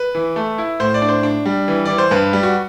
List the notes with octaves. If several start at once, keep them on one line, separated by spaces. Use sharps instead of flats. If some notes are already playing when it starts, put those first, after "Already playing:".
Already playing: B4
E3
A3
E4
A2 C5
D5
D4
C5
D4
G3
E3
E3 D5
C5
G2 B4
G3
F#4